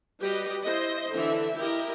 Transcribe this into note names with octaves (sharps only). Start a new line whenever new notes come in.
G3 F#4 G4 B4 D#5
E4 C5 D#5
D3 E3 E5
E4 G4 A#4 D#5